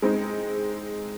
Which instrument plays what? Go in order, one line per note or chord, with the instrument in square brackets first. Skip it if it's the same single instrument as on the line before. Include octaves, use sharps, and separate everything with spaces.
[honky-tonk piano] G#3 C4 D#4